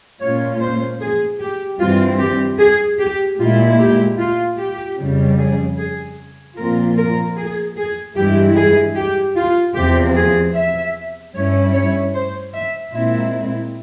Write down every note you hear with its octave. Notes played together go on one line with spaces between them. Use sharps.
A#2 G#3 C#4 F4 C#5
C5
G#4
G4
G2 E3 G3 C4 F4
G4
G#4
G4
A#2 G#3 E4 F4
G4
F4
G4
F2 C#3 G3
G#4
G#4
A#2 F3 C4 F4 A#4
A#4
G#4
G#4
G2 E3 G#3 E4 G4
G#4
G4
F4
E2 C3 F3 C4 G4
G#4
E5
G2 G3 C#4 E4 C#5
C#5
C5
E5
A#2 G#3 C4 E4 E5